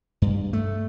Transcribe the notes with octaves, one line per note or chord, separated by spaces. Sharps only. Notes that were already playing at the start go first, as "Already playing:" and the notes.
G2
A3